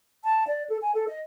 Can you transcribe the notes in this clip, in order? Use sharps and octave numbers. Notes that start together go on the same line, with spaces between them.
A5
D5
A4
G#5
A4
D#5